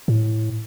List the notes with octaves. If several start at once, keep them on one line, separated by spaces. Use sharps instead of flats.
A2